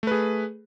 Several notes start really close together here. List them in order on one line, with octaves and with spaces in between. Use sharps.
A3 B4 G#4